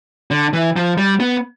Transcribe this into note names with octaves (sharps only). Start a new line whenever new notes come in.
D3
E3
F3
G3
B3